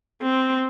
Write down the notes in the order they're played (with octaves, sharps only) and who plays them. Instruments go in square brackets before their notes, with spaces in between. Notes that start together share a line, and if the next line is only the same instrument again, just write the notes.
[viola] C4